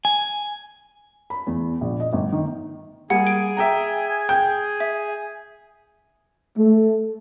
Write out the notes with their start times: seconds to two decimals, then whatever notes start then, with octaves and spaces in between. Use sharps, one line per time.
0.05 G#5
1.30 B5
1.47 E2
1.81 A#1
2.00 D#5
2.13 G1
2.32 D#3
3.10 G3 A#3 G#4 F#5 G#5
3.27 D7
3.57 E5 G5 A#5
4.29 G5 G6
4.80 E5
6.58 A3